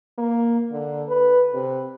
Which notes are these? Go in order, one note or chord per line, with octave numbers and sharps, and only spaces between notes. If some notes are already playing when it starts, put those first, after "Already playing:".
A#3
D3
B4
C3